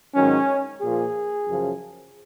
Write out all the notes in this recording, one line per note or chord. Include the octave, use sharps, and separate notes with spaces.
G#2 D#3 F#3 C#4
A#2 F3 G#4
F#2 C#3 F3